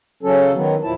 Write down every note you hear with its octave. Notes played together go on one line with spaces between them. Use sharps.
C#3 F#3 C#4 A4
D#3 F#3 B3
D#2 A#2 F3 E4 A5